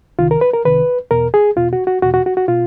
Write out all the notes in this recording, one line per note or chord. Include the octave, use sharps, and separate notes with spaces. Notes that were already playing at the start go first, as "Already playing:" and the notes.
C2 C3 D#3 F4
A#4
B4
A#4
C2 C3 D#3 B4
E2 B2 A#4
G#4
E2 B2 F4
F#4
F#4
E2 B2 F#4
F#4
F#4
F#4
B2 F4